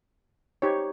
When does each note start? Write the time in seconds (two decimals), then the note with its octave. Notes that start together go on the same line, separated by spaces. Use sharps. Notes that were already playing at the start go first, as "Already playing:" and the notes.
0.62 D#4 G4 C5 C#5